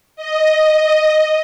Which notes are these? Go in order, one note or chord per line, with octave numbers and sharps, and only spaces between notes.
D#5